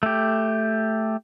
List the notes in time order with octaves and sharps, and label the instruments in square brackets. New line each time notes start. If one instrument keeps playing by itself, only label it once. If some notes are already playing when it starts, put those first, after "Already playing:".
[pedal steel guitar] A3 G4